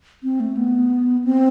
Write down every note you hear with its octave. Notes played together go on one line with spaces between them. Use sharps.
C4
A3
B3
C4